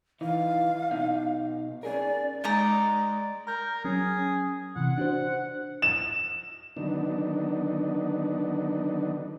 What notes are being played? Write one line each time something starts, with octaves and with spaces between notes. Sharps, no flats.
E3 D#4 F5
B2 D#4
C#4 G#4 A#4 D5
G#3 D#4 D5 A#5
A#4 A#5 G6
F#3 C#4 G#4
C3 E3 F#5
D4 F#4 C5
E7
D3 D#3 F#3 B3 D4 D#4